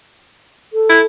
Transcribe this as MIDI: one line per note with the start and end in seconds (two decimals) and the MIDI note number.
0.73 1.05 69
0.90 1.00 64